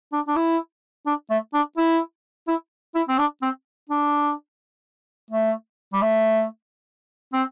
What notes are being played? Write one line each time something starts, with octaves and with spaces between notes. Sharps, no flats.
D4
D4
E4
D4
A3
D4
E4
E4
E4
C4
D4
C4
D4
A3
G3
A3
C4